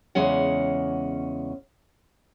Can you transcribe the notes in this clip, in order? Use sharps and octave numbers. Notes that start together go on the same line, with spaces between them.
E2 C#3 G#3 C#4 F#5